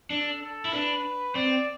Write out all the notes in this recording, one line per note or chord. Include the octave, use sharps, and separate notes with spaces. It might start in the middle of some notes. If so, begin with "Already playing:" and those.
D4 A4
A4
E4
D4 B4
C4 D5